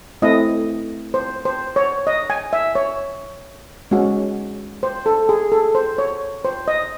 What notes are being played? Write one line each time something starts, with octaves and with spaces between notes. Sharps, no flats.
A3 C4 E4 D#5
C5
C5
C#5
D#5
G#5
E5
C#5
G#3 C#4 F#4
C5
A4
G#4
A4
C5
C#5
C5
D#5